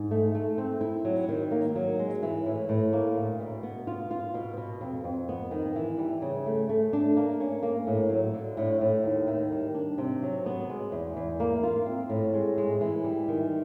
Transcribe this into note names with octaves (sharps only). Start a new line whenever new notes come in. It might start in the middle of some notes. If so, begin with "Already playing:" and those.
Already playing: G#2
A3
A3
C4
E4
F#3
D#3
A#3
F#3
G#3
E3
A2
A2
A#3
D2
B2
B3
F4
F4
B2
B2
F2
F2
B3
D#3
E3
G3
C#3
A3
A3
D4
A#3
C#4
A#3
A2
F#3
D3
A2
A2
D#2
D#3
G3
D4
C3
F#3
B3
G#3
E2
E2
A#3
F4
C4
A2
G#3
G#3
E3
G3
D#3